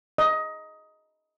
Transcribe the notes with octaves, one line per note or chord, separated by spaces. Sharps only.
D#5